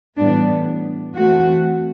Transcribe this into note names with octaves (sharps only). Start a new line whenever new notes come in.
A2 E3 G3 B3 D4
E3 A3 C4 F#4